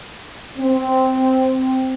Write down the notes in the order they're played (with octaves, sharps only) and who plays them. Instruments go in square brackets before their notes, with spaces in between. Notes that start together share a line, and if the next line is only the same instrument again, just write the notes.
[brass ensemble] C4